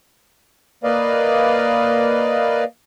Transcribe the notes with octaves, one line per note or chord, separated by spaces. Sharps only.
A#3 B4 D5 D#5 F5